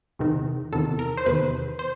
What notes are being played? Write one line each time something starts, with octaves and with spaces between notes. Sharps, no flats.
E2 C3 D#3
E2 C3 D#3 A4
A#4
C5
E2 C3 D#3 B4
C5